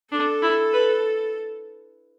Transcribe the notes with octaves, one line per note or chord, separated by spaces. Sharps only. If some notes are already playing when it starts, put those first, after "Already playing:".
D4 A4
E4
B4